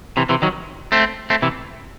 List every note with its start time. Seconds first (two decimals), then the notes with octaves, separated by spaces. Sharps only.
0.17 C3 E3
0.29 C3 E3
0.42 D#3 F#3
0.92 A3 C4
1.30 A3 C4
1.42 C3 E3